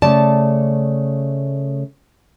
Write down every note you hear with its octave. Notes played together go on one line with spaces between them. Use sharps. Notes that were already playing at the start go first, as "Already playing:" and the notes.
C#3 A3 D5 A5